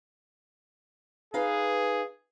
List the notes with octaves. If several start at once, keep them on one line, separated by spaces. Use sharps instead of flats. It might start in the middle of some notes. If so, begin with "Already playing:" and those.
D#4 G#4 B4 F5